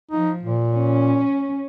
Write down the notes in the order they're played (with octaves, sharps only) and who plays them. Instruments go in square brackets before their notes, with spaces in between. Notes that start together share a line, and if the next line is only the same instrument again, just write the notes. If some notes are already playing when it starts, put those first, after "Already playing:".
[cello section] F3 [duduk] D#4
[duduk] A#2
[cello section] C#4